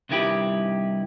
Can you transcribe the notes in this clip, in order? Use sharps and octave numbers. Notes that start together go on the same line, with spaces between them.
C2 G2 D#3 E4 G4 B4